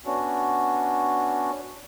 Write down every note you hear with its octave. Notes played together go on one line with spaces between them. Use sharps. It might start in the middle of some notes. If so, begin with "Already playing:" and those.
B3 C#4 D4 F#4